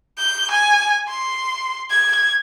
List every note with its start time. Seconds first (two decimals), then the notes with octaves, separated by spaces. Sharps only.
0.18 G6
0.51 G#5
1.08 C6
1.91 G#6